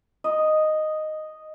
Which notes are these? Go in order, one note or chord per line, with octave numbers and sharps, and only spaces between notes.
D#5